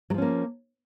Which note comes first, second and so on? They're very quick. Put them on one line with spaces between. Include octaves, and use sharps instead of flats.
F#3 F3 C#4 A#3